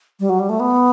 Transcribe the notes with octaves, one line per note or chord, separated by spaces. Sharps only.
G3
F#3
G3
A3
B3